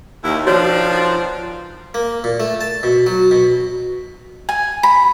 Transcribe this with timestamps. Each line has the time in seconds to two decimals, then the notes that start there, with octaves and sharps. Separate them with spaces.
0.24 D#2 E4
0.47 B2 D#3 F3 D4 F#4 C#5
1.94 A#3
2.24 A#2
2.40 A3
2.61 A5
2.83 B2
3.06 F#3
3.31 B2
4.49 G#5
4.83 B5